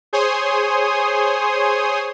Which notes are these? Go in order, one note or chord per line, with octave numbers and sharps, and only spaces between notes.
G#4 C5 C#5 G#5 C6 D#6